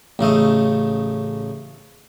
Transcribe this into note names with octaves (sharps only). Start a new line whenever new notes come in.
A1 C#3 A3 D#5